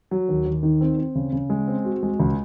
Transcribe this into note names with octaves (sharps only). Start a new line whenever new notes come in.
F#3
D#2
D#2
D#3
C4
C4
C#3
C#3
G#3
C4
F#4
G#3
C#2